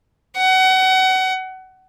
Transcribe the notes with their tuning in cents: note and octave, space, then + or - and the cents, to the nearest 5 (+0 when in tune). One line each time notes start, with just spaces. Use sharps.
F#5 +30